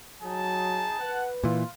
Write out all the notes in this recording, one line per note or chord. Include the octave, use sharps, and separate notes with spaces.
F#3 D#4 G#4 A5
B4 F#5
A#2 E3 F4